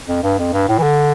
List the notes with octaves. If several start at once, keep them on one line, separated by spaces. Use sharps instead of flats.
F2
G2
F2
G2
A2
E3
D3